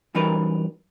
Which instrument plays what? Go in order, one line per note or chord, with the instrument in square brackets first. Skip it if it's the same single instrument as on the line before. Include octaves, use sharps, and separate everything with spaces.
[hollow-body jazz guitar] F#2 E3 G3 D#4 A#4 B4